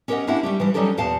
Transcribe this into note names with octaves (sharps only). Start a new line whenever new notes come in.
C#4 G4 A#4 C5 D#5 F#5
A#3 C#4 D4 E4 G4 F#5
G3 A3 G4
E3 F3 G3
F#3 G3 C#4 D#4 G4 A4
E2 A#2 G4 F5 F#5 A5